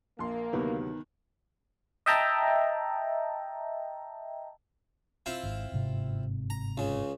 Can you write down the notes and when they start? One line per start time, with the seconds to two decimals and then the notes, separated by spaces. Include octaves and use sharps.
0.19 A#1 A#3 C6
0.53 D2 C3 D#3 F#3 B3
2.06 D#5 E5 G5 A5 A#5
5.26 C4 E4 F4
5.43 G#1 G#2
5.72 G1 G#2 C3
6.50 A#5
6.77 C#2 C#3